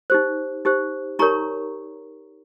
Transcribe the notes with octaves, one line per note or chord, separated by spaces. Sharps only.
D#4 G4 C5
D#4 G4 C5
D#4 G4 A#4 C#5 A#5 C#6